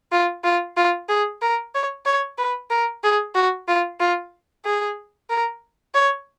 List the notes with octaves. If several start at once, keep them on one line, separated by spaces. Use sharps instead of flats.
F4
F4
F4
G#4
A#4
C#5
C#5
B4
A#4
G#4
F#4
F4
F4
G#4
A#4
C#5